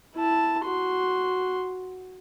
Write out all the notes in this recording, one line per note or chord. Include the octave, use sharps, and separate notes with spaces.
E4 A5
F#4 C6